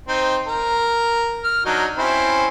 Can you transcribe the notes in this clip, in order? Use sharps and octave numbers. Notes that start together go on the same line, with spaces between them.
C4 D#4
A#4
F6
F#3 D4 D#4
C4 C#4 E4